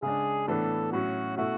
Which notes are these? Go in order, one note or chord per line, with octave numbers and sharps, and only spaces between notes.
C#3 G#3 D4 G#4
A2 E3 B3 D4 A4
A2 F#3 C#4 F#4
B2 A3 E4 F#4